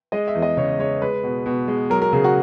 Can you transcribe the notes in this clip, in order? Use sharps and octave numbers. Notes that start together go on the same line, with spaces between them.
G#3 D#5
E5
E2
D#5
C#3 C#5
G#3 C#5
G#3 B4
B2
B2
G#3
F#3 A#4
A#4
C#3 G#4
F#4